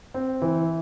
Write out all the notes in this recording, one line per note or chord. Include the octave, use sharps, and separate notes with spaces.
C4
E3